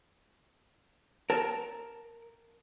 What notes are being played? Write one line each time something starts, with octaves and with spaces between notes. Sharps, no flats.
A#4 A5